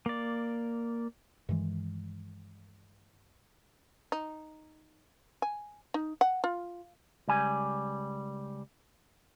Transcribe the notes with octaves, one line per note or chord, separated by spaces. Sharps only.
A#3 D5
G2 D#3 E3 G#3
D#4
G#5
D#4
F#5
F4
C#2 G3 G#5